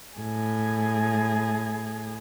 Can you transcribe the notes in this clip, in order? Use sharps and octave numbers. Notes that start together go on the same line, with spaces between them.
A2 G#4